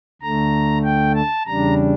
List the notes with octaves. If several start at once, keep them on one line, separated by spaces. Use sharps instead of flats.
D2 D3 A3 A#5
G5
A5
E2 C#3 G3 D4 A#5